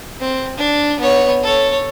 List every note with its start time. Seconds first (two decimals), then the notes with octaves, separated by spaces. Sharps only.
0.20 C4
0.57 D4
0.99 B3 C#5
1.43 A4 C#5